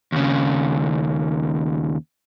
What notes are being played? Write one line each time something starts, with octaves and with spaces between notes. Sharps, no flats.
D#2 C#3